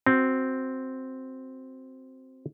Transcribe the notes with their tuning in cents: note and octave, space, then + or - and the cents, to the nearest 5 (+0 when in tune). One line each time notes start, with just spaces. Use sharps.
C4 +0 F#4 +0